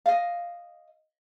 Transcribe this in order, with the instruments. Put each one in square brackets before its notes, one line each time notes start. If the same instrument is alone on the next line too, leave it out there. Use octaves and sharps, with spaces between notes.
[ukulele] D#5 F5